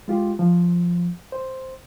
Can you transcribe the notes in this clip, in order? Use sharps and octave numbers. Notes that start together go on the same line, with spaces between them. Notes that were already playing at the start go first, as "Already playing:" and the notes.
G#3 F4 G4
F3
C5